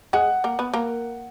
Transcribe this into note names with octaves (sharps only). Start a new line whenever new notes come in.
G#3 G#4 F#5
A#3 A#4
B3 B4
A#3 A#4